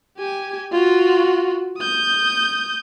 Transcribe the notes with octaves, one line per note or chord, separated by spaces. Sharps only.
G4 G#5
F4 F#4
D#6 G6